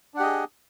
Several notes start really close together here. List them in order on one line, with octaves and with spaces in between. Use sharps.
D4 F#5 G4 D#5 G#4